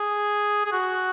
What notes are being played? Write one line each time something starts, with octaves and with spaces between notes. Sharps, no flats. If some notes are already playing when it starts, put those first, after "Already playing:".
Already playing: G#4
G#4
F#4